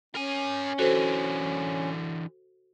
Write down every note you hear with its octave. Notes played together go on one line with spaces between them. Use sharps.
C#4 A#4 G#5
D3 E3 F#4 A4 C5